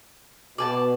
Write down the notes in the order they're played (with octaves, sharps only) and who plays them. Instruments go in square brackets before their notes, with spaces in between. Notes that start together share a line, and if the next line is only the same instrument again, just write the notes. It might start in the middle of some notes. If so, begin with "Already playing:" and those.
[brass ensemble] B2 [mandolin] D5 G#5 A5